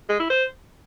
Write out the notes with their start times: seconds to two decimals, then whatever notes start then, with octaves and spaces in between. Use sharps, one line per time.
0.09 G#3
0.20 E4
0.30 C5